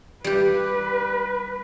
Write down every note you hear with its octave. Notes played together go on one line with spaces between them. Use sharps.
G3 G4 B4